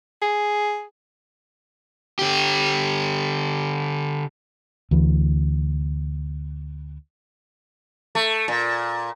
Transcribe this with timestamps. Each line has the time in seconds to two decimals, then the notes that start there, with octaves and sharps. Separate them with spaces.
0.22 G#4
2.19 D3 G4
4.91 D2 E3
8.15 A3
8.48 A#2